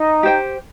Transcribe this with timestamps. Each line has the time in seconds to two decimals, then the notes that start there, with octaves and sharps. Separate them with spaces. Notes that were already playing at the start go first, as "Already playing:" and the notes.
Already playing: D#4
0.23 G4 C5 G5